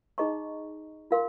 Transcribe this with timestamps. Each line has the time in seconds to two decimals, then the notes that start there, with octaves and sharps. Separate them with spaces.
0.18 D#4 G#4 D#5 A#5 C#6
1.11 F4 A#4 F5 C6